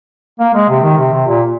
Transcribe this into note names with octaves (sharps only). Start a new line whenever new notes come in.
A#3
G#3
C3
D#3
C3
C3
A#2